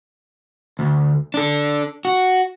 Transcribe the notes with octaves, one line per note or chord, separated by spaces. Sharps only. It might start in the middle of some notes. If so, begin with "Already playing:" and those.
D2
D4 A4
F#4